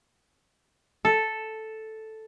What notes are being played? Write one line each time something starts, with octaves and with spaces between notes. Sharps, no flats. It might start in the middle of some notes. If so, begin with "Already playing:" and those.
A4